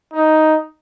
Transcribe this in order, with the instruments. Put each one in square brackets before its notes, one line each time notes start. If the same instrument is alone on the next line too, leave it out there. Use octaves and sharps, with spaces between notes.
[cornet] D#4